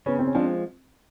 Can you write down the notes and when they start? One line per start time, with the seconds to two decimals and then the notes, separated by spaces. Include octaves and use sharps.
0.06 C#3 B3 C#4
0.19 C4
0.27 C#4
0.35 F3 G#3 C4 D4